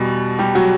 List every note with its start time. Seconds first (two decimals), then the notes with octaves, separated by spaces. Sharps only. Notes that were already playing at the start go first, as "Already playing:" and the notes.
Already playing: E2 B2 G3
0.39 G3 G4
0.55 F#3 F#4